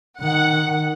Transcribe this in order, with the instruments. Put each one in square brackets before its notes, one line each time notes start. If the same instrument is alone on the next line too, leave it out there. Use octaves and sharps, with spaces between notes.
[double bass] D#3 [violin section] F#5